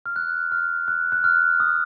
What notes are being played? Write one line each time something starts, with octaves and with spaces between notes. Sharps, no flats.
F6
F#6
F6
F#6
F#6
F6
D#6